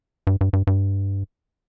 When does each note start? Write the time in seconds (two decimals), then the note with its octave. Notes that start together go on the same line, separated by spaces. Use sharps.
0.27 G2
0.41 G2
0.53 G2
0.67 G2